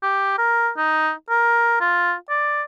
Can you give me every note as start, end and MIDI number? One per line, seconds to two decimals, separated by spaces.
0.02 0.34 67
0.38 0.70 70
0.77 1.11 63
1.30 1.78 70
1.81 2.14 65
2.29 2.63 74